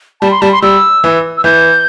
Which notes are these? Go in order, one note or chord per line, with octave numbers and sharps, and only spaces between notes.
G3 A5
C6
G3 A5
C6
G3 E6
E3
E6
E3 G6